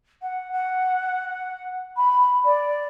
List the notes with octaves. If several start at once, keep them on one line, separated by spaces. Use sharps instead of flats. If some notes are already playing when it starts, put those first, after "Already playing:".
F#5
F#5
B5
D5